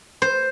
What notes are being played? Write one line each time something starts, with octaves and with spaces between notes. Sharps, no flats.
C5